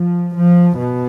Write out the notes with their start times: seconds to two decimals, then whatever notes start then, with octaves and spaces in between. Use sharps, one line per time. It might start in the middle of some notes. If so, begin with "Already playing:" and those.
Already playing: F3
0.34 F3
0.77 B2